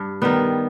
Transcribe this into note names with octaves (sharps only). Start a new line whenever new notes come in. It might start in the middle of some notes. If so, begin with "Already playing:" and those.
Already playing: G2
D#3 G3 B3